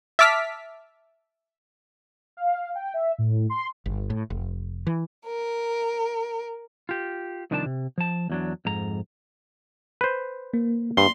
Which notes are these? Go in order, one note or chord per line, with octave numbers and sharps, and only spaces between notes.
E5 A5 D6 F6 B6
F5
G5
E5
A2
C6
G1
A2
F1
E3
A#4
F4 G4
C2 D#3 F3 D4 G#5 A5
C3
F3 A5
E2 F#3 D4
F2 G#2 A#5
B4 C5
A#3
G2 C6